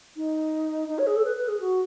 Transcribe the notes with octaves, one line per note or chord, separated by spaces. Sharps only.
D#4
D#4
C#5
G#4
A4
B4
B4
G#4
F#4